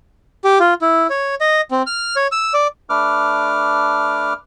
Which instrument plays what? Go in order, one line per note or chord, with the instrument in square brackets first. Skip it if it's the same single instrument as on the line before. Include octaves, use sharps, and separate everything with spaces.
[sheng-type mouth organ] G4
F4
E4
C#5
D#5
C4
F6
C#5
E6
D5
[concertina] A3 D4 B4 D6 F6